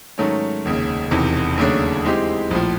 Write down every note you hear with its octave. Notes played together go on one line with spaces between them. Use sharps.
G#2 D#3 F#3 A3 C#4
F1 D#2 C#3
E1 E2 C3 D#3
D#2 C#3 F#3 A3 D4
E3 G#3 C4 D#4 G4
A#1 A2 F3